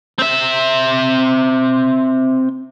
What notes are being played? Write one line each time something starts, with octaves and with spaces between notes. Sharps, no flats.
C4 E5